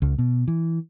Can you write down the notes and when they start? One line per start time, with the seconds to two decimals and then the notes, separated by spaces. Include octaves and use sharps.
0.02 C#2
0.18 B2
0.48 E3